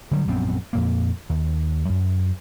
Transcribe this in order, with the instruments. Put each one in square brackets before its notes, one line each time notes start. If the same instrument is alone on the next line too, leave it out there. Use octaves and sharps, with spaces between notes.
[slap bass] D3 F#3 G3
A#1 F#2 B3 C4
F2 A#2 A#3
D#2
F#2